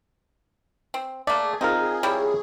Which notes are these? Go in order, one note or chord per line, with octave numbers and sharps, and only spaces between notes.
C4
A3 A#3 G#4 D5
C4 D#4 F4 A#4
G3 E4 C#5